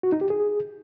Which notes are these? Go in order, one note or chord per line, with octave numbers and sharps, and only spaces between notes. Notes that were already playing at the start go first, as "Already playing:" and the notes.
F#4
D#4
G4
G#4